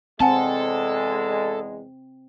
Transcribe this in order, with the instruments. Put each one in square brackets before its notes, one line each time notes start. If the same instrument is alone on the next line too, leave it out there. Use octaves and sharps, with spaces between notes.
[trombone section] E2 G#3 [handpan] C4 [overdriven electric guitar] A4 [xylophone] F#5 G#5 A5